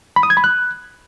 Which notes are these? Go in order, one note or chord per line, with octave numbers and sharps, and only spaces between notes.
B5
D#6
G#6
B5
F#6